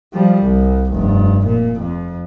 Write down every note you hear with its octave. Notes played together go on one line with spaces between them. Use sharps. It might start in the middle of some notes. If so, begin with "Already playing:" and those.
F3 G3
C2
F1 G2
A#2
F2